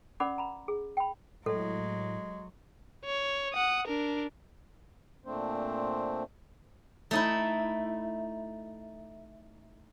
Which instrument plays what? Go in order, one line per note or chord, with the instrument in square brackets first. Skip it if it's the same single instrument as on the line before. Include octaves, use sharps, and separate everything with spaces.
[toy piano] C#4 A#4 D5 F#5 B5 D6
A#5 B5
G#4
G5 B5
[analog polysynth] A2 [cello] F#3 [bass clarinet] G#3 [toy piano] A4
[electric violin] C#5
F#5 D#6
D4 A#4
[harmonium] A#2 A3 C4 D4 C5
[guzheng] A3 D#4 E4